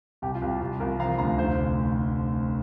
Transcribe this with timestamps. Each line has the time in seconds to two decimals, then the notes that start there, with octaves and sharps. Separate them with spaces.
0.22 C2 G4
0.35 F4
0.42 C2
0.48 G4
0.61 C2 G4
0.80 C2 F4 A#4
1.00 F3 F5 A#5
1.18 D2 F5 A#5
1.38 F1 C5 F5